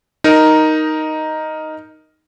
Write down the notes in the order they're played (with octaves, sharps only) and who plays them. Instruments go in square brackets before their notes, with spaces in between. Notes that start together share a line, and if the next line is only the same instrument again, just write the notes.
[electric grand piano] D#4 A#4